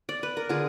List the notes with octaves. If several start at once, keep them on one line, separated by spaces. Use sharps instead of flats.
D5
B4
A#4
D3 F4 G#4